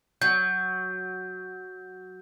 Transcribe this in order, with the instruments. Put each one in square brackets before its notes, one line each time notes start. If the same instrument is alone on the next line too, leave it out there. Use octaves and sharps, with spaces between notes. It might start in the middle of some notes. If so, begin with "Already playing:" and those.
[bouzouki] F#3 [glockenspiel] G6